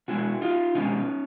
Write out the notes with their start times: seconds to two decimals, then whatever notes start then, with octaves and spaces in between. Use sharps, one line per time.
0.08 B2 G#3 E4 F#4
0.42 D#4 F4
0.75 B2 G#3 C#4 D#4